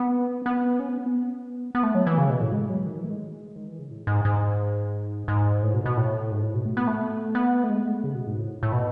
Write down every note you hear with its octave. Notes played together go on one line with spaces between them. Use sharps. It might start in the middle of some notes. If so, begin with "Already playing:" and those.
Already playing: B3
B3
C#4
B3
C#4
B3
B3
A3
F#3
E3
C#3
B2
A2
G#3
F#3
D#3
E3
A3
G#3
D#3
E3
C#3
A2
G#2
G#2
G#2
A2
B2
B2
A2
G#2
A2
B2
A3
B3
A3
B3
A3
G#3
A3
C#3
B2
G#2
A2
A2
B2